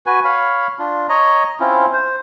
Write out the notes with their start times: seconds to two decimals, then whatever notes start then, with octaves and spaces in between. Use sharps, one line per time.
0.06 F#4 B4 G#5
0.25 C#5 F5 B5
0.79 D4 F4
1.09 C#5 D#5 A#5
1.60 C4 C#4 E4 F4
1.93 C5